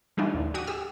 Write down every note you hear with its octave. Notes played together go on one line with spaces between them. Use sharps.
E3 G3 A3 D4 D#4 F4
D#2 A2 D3
F#4 G4 C#6 D#6
G4 G#4 E6